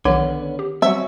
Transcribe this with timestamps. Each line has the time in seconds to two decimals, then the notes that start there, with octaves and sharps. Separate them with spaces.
0.05 B1 D3 D#3 F3 B3 C#4 F#5
0.59 G4
0.82 F#3 G3 C4 C#4 F#4 E5